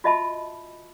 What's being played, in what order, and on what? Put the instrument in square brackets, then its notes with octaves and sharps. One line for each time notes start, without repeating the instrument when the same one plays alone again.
[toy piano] F4 F#4 D#5 E5 A5 B5